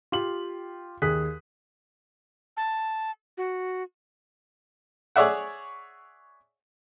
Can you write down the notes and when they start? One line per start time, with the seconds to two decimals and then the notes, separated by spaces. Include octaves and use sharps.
0.12 F4 G4 F#7
1.02 D#2 G#4 D#6 F#6 B6
2.57 A5
3.37 F#4
5.16 G#4 C#5 D5 E5 F#5